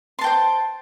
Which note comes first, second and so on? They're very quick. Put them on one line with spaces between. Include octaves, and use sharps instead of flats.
C6 A5 G5 C5